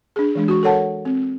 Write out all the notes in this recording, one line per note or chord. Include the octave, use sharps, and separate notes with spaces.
D4 G#4
E3 G#3 D4
F#4 C#6
A4 A#4 C#5 F#5 A5
C4